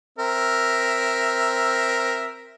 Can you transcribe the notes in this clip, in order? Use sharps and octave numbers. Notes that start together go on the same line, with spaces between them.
C4 A#4 E5